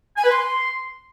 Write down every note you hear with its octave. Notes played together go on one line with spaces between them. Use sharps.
G#5
B4
C6